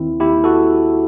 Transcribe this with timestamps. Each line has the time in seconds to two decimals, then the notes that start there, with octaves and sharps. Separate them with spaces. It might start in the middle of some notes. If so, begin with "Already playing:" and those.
Already playing: D#2 D#3 C4 E4
0.20 D#2 E4 G4
0.44 F#4 A4